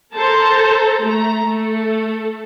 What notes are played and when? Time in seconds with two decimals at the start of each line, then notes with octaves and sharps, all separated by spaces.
0.15 A4 A#4 C5 A5 A#5
1.03 A3 A#5
1.45 A3 A4